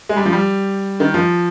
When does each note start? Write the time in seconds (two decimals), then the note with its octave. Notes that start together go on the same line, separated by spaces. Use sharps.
0.09 G#3
0.17 G3
0.26 F3
0.32 G3
1.00 D#3
1.14 F3